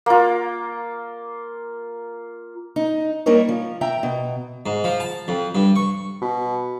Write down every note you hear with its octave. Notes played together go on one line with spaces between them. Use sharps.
A#3 F4
D#4
G3 A#3 D#4 A#4 C#5
F3
E5 G5 A#5
B2
G#2
F3
A5
F2
G2
C#6
B2